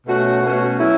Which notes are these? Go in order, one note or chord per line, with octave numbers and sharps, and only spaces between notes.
B2 A3 C#4 F#4
B2 A3 C#4 F#4
F#3 C#4 E4